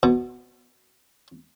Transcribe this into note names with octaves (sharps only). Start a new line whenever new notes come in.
B2